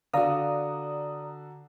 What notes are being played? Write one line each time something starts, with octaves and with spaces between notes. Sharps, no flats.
D3 F#4 B4 D5 F5 A#5 D#6